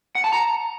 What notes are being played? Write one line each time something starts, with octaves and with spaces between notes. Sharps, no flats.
F#5
A5
A#5